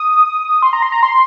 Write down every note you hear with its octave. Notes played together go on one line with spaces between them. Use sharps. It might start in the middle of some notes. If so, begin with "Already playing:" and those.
Already playing: D#6
C6
A#5
C6
A#5
C6